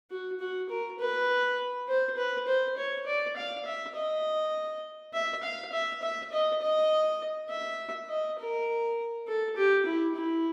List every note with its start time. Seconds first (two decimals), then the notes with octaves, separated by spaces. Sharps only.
0.11 F#4
0.40 F#4
0.70 A#4
0.99 B4
1.88 C5
2.17 B4
2.48 C5
2.77 C#5
3.06 D5
3.37 F5
3.66 E5
3.95 D#5
5.13 E5
5.43 F5
5.72 E5
6.02 E5
6.32 D#5
6.62 D#5
7.49 E5
8.09 D#5
8.38 A#4
9.28 A4
9.57 G4
9.86 E4
10.16 E4